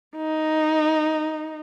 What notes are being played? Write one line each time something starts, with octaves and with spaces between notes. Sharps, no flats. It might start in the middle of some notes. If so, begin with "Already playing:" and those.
D#4